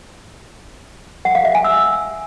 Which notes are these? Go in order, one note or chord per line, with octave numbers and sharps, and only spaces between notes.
F#5
F5
E5
G#5
E6